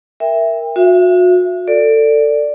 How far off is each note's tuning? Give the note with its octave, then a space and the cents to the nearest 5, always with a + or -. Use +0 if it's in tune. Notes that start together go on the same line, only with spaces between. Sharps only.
A#4 +0 E5 +0 G5 +35
F#4 -35 E5 +30
A4 +25 D5 +0